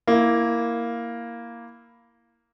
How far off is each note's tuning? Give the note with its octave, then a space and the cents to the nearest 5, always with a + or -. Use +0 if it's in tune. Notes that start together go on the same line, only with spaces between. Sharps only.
A#3 +0 E4 +0